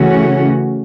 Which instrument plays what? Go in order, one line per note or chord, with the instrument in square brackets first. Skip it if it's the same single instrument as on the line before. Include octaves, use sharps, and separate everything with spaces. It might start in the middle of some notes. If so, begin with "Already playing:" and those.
Already playing: [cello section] C#3 E3 A3 C#4 F#4